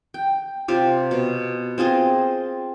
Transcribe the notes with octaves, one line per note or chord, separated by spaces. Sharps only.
G5
C3 F4 G4
B2
C4 F4 G#4 D#5